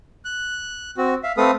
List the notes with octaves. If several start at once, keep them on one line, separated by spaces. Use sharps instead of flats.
F#6
C4 F#4
E5 F5
A3 C4 A4 B4 F5 D#6